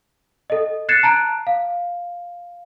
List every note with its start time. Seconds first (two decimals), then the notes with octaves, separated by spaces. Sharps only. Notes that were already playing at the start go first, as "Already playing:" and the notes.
0.50 A4 D#5
0.89 F#6 G#6 A6 C7 C#7 E7
1.03 A5 A#5 F#6 D7
1.47 F5